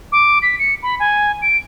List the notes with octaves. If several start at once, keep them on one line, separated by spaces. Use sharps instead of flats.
D6
B6
C#7
B5
G#5
D7